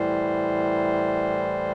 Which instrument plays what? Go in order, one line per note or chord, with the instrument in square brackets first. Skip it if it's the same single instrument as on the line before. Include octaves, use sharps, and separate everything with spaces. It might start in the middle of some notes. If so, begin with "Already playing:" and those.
Already playing: [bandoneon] A2 E3 G3 C5